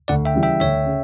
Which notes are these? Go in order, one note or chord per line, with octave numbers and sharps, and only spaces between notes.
D2 D5 F#5
E5 G5
C#3 E3 G3
E5 G5
D2 C#5 E5
C#3